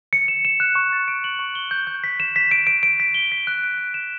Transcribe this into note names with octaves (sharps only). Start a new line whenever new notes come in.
C#7
E7
E7
F#6
C#6
A6
D7
F#7
C#6
G7
G6
G6
B6
E7
B6
D7
D7
D7
B6
G7
B6
F#6
D7
D7
E7